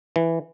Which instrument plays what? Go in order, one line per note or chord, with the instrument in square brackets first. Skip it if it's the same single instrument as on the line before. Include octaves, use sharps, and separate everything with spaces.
[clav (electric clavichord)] E3